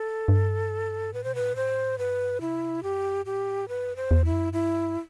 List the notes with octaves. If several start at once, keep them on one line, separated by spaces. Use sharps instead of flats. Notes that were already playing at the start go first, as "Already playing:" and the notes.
Already playing: A4
G2
A2 B4
B2 C5
A2 B4
B2
A2 C5
G2 B4
C3 E4
F#2 G4
A2 G4
G2 B4
F#2
C5
E2
E4
F#2
G2 E4